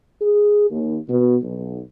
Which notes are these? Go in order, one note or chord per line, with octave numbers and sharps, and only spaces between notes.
G#4
D#2
B2
B1